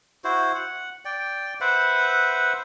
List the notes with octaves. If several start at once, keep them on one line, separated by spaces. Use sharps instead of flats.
E4 F#4 C5
F#5
D5 G5
B4 C5 E5 F#5